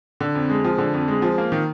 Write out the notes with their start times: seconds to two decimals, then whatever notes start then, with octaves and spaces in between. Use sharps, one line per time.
0.21 D3
0.35 F2
0.50 G#3
0.64 F3
0.78 D3
0.94 F2
1.08 G#3
1.22 F3
1.38 A#3
1.52 D#3